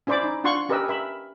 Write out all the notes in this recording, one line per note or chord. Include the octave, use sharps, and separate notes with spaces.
C#4 E4 C5 D5 B5 D6
D#4
D4 F4 F#5 C6 C#6
C#4 G4 A#4 B4 D#5 E6
A#4 E5 B5